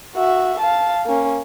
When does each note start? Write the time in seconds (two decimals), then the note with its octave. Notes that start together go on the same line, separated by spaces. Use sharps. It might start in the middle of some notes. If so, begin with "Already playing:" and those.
0.16 F#4 E5
0.60 F5 A5
1.06 A#3 C#4